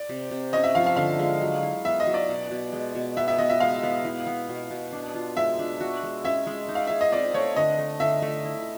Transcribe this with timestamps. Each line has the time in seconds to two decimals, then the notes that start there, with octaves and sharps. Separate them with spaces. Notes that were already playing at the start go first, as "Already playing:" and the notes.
Already playing: D5
0.09 C3
0.31 C3
0.53 C#4 D#5
0.64 E5
0.75 F3 F5
0.86 F5
0.96 D3 F5
1.19 G#3
1.41 F#3
1.63 E4
1.85 B3 E5
2.00 D#5
2.07 F#3
2.14 D5
2.29 B2
2.51 B2
2.73 G#3
2.95 B2
3.17 B3 E5
3.28 E5
3.38 B3 D#5
3.50 E5
3.60 G#3 F5
3.83 B3
4.05 E4
4.27 B3
4.49 B2
4.71 B2
4.92 D4
5.15 F4
5.37 G#3 E5
5.59 D4
5.80 F#4
6.03 G#3
6.24 C#4 E5
6.47 G#3
6.69 D#4
6.75 F5
6.87 G#4 E5
7.01 D#5
7.12 C4 D5
7.34 A3 C#5
7.56 D3 D#5
7.79 A3
8.00 D3 E5
8.22 A3
8.45 E4